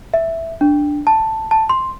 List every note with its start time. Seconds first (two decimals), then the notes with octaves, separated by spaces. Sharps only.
0.14 E5
0.61 D4
1.07 A5
1.51 A5
1.70 C6